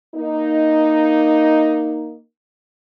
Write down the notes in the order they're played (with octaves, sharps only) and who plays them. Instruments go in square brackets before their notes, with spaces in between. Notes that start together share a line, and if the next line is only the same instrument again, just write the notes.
[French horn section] A#3 D#4